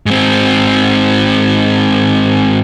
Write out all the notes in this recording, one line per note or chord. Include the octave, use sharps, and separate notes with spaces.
G#2 C4